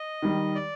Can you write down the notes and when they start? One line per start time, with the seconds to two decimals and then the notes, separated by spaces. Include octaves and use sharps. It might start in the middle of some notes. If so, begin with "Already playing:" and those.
Already playing: D#5
0.22 D#3 G3
0.55 D5